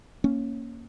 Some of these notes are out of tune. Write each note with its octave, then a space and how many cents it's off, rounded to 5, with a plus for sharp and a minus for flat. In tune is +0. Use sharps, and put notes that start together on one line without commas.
A#3 +0 C#4 +0